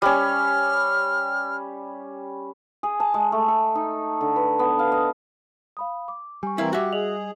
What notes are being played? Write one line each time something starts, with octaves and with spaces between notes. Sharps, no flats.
G3 C#4 F6
G#4
A5
G#3
A3
A4
D#4
D3
B4
B3
F5
D#5
F5 B5 D#6
D6
G3 G#5 C#6
E3 C4 E4 A#4 F5
F#4 G4 E5
G#4 D#5 F7 F#7